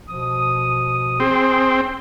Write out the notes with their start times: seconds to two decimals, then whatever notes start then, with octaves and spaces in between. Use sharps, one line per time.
0.09 B2 F3 D#6
1.20 C4 G#4